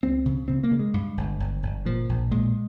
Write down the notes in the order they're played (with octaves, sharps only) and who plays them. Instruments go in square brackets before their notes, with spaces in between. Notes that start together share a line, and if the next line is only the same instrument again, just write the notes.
[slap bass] C#2 C4
C#3
C#3 C4
A#3
C#3
G#3
G2
G1
G1
G1
A#2 F3
A#1
A#2 G#3